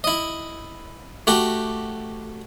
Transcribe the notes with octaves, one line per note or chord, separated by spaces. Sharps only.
E4 D#5
A3 F#4 G4